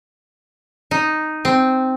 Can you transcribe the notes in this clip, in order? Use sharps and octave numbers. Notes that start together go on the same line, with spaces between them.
D#4
C4